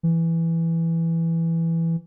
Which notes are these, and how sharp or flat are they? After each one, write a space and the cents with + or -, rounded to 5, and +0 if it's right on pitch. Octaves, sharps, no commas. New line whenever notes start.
E3 +5